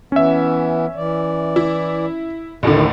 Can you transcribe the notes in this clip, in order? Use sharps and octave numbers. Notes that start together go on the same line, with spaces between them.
E3 B3 C#4 E5
E3 D5
E4
A1 D#2 A2 D3 D#3